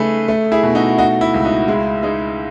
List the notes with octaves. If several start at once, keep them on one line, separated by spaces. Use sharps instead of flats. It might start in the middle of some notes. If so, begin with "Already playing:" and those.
Already playing: C#3 A3 D#4 G#4 B4
A3
E4 G#4
B2
D#4 F#4
D#4 F#4
E4
C#2
D#4 F#4
G#3 E4
G#3 D#4